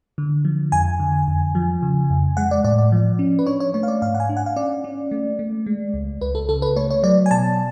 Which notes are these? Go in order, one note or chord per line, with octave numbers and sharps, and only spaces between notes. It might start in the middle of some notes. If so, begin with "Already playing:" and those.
D3
F3
F2 G#5
D3
F2
F3
C#3
F2
G#3 F#5
D5
A2 D5
D5
F3
C#4
B4
D4 C#5
C#5
A3 C#5
F5
D5
G#2 F5
F#5
G#5
D4
F#5
F5
C#4 D5
C#4
A3
A3
G#3
C#2
C#2 B4
A4
C#3 A4
B4
A3 C#5
C#5
F#3 D5
G#5
B2 A5